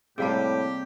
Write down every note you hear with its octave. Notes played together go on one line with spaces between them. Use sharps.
A2 C3 G3 A#3 G4 G#4 F5 A5